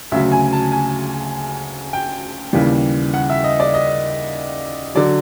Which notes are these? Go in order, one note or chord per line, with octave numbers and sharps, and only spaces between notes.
D2 C#3 F#3 E5
G#5
A5
G#5
G5
D#2 C#3 E3 G3
F#5
E5
D#5
D5
D#5
D3 F#3 D5